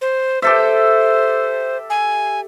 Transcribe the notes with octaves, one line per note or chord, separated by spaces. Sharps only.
C5
G4 A4 C5 E5
G#5